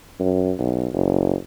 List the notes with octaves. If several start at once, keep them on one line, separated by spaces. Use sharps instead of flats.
F#2
B1
F#1